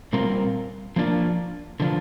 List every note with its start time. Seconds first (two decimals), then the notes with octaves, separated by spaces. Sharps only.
0.13 A#2 G3 C4 F4 A#4
0.96 F3 A#3 D4 F4
1.80 D3 F3 D4 F4